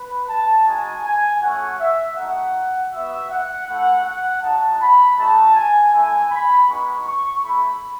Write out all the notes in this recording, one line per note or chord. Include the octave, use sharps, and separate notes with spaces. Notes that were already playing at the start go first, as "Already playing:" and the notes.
Already playing: B4
A5
G#3 D#4 F#4 G#5
G#5
A3 C#4 F#4 F#5
E5
A3 D#4 F#4 F#5
B3 F#4 E5
F#5
A3 E4 F#5
F#5
G#3 D#4 F#4 A5
B5
A3 D#4 F#4 A5
G#5
A3 E4 G#5
B5
G#3 B3 D#4 F#4 C#6
C#6
A3 E4 B5